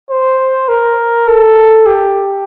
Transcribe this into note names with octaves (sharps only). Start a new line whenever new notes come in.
C5
A#4
A4
G4